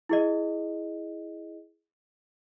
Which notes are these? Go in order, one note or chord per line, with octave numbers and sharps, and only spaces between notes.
E4 G#4 D#5